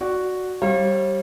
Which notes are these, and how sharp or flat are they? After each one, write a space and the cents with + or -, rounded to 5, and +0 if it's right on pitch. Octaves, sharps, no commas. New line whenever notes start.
F#4 +0 D5 +0
G3 -20 C#5 -45 F5 -15